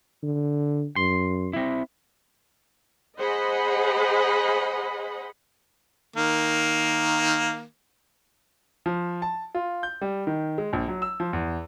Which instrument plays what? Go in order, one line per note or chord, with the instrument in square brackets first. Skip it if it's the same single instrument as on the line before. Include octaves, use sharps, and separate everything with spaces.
[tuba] D3
[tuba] F#2 [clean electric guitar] C6
[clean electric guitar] C4 E4
[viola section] G#4 C5 D#5 F#5 B5
[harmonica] D#3 A#3
[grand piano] F3
A5
F4
G6
G3
D#3
G#3
A#1
F#3
E6
F3
E2